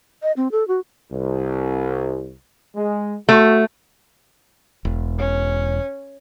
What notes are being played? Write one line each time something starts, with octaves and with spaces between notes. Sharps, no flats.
D#5
C4
A4
F#4
C2
G#3
A3 F#4
E1
C#4